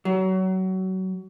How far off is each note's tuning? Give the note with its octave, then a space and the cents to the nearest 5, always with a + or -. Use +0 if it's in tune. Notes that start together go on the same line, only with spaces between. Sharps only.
F#3 +25